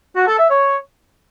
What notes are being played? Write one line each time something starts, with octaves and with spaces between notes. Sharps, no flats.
F#4
A4
E5
C#5